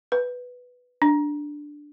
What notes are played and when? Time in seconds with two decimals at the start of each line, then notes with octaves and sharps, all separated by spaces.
0.12 B4
1.02 D4